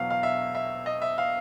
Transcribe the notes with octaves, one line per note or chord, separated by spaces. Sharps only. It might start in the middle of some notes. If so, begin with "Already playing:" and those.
Already playing: E2 B2 F#3 F5
F5
E5
E5
D#5
E5
F5